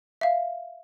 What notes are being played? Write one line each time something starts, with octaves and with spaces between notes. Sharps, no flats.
E5 F5